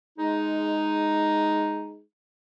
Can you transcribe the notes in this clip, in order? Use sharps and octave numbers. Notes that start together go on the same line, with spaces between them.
G#3 D#4